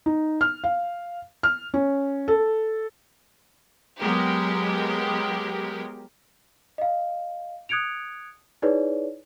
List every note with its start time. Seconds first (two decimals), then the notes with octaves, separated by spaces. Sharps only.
0.06 D#4
0.41 F6
0.64 F5
1.43 F6
1.74 C#4
2.28 A4
4.00 F#3 G#3 B3 G4 A#4
6.78 D#5 F5
7.69 D#6 F#6 G#6 C#7 D7 F7
8.62 D#4 E4 G#4 B4 C#5 D5